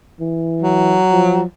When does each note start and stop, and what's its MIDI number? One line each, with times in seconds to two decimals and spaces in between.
0.20 0.99 52
0.62 1.43 54
1.12 1.44 53